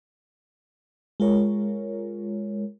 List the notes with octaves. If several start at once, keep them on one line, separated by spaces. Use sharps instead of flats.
G#3 F4 A#4 C#5